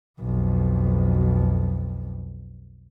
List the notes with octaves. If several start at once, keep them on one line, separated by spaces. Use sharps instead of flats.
B1 F2